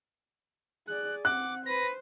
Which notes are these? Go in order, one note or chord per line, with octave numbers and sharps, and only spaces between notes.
G#4 D5 F#6
C4 F#5 D6 F#6
B4 C5 A#6